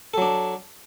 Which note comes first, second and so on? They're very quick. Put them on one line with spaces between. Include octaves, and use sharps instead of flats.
A4 F#3 D4